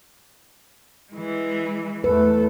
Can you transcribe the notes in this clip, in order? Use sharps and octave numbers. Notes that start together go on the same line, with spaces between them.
E3 G#3
E2 A3 A4 B4